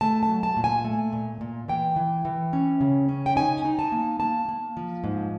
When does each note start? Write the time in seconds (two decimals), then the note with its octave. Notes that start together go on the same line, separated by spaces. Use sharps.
0.01 A3 A5
0.23 A5
0.29 F#3
0.43 A5
0.57 A#2
0.64 G#5
0.85 A3
1.13 A#2
1.41 A#2
1.68 E3 G5
1.96 E3
2.25 E3
2.53 C#4
2.81 C#3
3.09 C#4
3.26 G5
3.36 D#4 G#5
3.65 D#4
3.79 A5
3.92 A#3
4.20 A#3 A5
4.49 A#3
4.77 F3
5.04 G#2